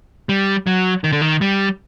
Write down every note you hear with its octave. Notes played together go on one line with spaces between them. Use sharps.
G3
F#3
D#3
D3
D#3
G3